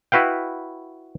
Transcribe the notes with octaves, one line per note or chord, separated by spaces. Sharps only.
E4 F#4 B4 F5 G5